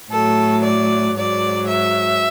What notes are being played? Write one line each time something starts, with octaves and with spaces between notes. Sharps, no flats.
A2 F#3 A4
D5
G#2 F#3 D5
E5